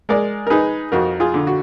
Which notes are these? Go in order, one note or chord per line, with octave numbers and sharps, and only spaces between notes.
G#3 A#4 D5
A#4
D#4 G#4 B4
F2 F#4 A#4
F4 G#4
D3
F#4